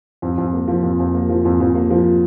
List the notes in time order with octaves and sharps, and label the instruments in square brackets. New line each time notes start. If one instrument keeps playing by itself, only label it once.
[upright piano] F2
F2
A#3
F3
F2
F2
A#3
F3
F2
F2
A#3
F3